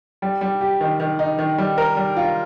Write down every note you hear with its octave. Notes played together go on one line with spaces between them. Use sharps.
G3
G3
G4
D#3
D#3
D#4
D#3
G3
A#4
G3
F4